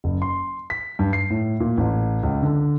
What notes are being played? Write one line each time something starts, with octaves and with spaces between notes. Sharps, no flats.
F#1
C6
B6
G2
C7
A2
A#2
A1
C#2
D3